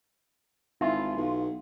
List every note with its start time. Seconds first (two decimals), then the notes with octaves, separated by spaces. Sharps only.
0.81 G#1 E4 F4
1.17 B1